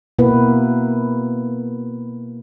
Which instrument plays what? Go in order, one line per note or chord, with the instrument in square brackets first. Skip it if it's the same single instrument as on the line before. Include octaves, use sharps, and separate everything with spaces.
[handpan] B2 A#3 B3 E4 B4